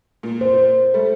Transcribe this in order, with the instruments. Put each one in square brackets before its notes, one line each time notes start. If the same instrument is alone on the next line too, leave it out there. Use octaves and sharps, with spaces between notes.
[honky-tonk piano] A#2
[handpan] C5
[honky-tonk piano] G3 A3